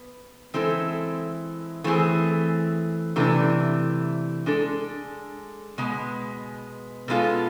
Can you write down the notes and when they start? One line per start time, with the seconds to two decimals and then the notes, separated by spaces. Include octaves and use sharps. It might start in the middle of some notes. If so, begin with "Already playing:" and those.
Already playing: B3
0.54 E3 G#3 C4 E4 A4
1.84 E3 A3 C4 G#4
3.16 C3 E3 A3 D4
4.46 G#3 D4 A4
5.78 B2 G#3 B3
7.08 B2 G#3 B3 F4 A4